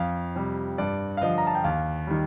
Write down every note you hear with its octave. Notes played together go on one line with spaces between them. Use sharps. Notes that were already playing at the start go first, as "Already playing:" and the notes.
Already playing: F2 F5
C3 G3
G2 D5
F5
D3 F3 D#5
A#5
A5
G5
D#2 F5
D#3 G3